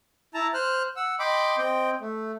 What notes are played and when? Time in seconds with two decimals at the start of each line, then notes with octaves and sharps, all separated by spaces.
0.34 E4 A5 A#5
0.54 C5 F6 F#6
0.96 F#5 E6
1.19 D#5 G5 B5 C6 D6
1.58 C4 D#5 G5
2.01 A3